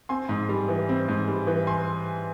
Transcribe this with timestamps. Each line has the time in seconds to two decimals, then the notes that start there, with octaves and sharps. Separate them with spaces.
0.09 C4 G#5 C6
0.29 G#2
0.49 G3
0.68 E3
0.89 C4
1.08 G#2
1.28 G3
1.47 E3
1.67 G#5 C6